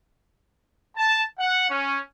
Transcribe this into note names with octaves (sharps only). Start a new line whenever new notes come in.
A5
F#5
C#4